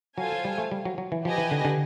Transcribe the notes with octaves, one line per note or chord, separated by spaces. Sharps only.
F#3 F4 A4 C5 F5 G#5
G3
A3
G3
F#3
F#3
E3
F3 G4 B4 D#5 G#5
E3
D3
D3